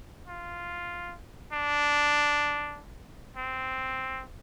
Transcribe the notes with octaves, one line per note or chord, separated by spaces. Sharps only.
F4
D4
C4